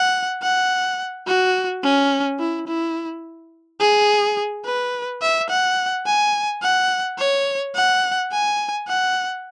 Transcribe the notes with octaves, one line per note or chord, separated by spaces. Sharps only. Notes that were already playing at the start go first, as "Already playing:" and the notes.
Already playing: F#5
F#5
F#4
C#4
E4
E4
G#4
B4
E5
F#5
G#5
F#5
C#5
F#5
G#5
F#5